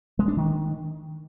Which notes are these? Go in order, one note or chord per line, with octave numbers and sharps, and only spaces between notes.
G#3
D4
D#3